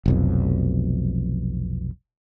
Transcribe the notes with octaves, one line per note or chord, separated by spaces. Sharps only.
F1 B1 F2